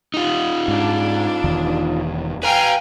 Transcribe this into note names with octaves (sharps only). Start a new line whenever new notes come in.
D#4 F4
G#2 D4
E1 E2 D#3
B4 F5 G5 G#5 A#5